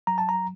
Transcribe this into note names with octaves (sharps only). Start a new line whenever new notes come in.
F#3 A#5
A5
A#5